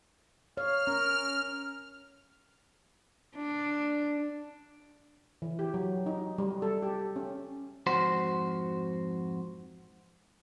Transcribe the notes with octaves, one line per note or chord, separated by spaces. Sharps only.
C#5 F5 F6
C#4 A#4
D4
E3
G4
F#3
D#4
G3
A4
G4
C#4
F2 G#2 F#4 C5